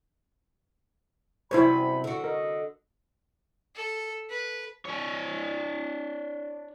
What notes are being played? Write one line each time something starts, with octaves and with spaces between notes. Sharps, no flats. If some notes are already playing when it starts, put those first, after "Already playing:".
F#2 C3 G3 E4 C5 C#5 B5
D3 F#4
A#4 D#5
A4
B4
D4 C#5